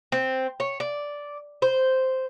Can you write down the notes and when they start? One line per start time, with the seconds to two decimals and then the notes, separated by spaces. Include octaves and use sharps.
0.12 C4
0.60 C#5
0.80 D5
1.62 C5